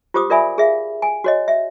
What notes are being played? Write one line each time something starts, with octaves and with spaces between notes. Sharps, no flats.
F4 G4 C5 D6 D#6
F4 A#4 D5 E5 G#5 B5
G#4 E5 F5
G#5
F#4 C#5 D#5
E5